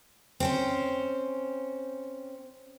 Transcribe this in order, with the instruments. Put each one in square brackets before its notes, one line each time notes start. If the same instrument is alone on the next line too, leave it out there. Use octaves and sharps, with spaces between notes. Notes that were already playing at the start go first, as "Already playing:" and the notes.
[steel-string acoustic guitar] C4 C#4 C5